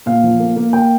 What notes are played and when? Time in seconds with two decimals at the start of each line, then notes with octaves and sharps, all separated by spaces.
0.06 A#2 F5
0.24 F3
0.40 A#3
0.56 A#3
0.73 A#3 G5